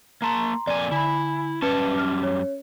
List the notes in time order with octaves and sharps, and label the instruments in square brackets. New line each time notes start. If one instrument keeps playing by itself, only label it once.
[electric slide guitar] A#3 A5 [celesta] A#5 C6
[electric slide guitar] F2 A#2 G#5 [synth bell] D5
[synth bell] D3 [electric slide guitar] E4 [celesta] G#5 B5
[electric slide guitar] F#2 G3 A5 [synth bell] C#4 [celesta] B4
[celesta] F6
C#5